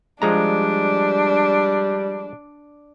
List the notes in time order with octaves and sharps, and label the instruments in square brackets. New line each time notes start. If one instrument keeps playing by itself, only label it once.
[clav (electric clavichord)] F3 G#3 A#5 [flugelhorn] G3 [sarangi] D4